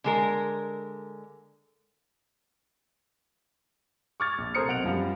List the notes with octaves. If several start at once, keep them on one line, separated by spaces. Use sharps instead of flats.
D3 G#3 A#4
C#6 D6 F6 G#6 A6
A#1
C3 A3 A#4 C5 D#6 C#7
B1 F#5 D7 F7
F#2 F3 G3